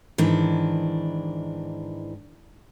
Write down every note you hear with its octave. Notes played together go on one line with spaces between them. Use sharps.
G#2 D#3 E3 D4